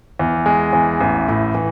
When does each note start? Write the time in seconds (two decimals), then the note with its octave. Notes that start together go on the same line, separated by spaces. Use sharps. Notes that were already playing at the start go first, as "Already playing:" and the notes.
0.19 E2
0.46 G#3
0.73 E2
1.00 A1
1.28 A2
1.55 E3